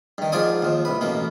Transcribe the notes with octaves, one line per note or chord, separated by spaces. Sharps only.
G2 D#3
G#2 F3 F4 D5 G#5 D#6
D#2 F3
C2 B4
A1 B2 A#3